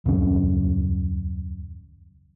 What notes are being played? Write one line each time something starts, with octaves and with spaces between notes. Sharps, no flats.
D#1 C#2 F#2 C#4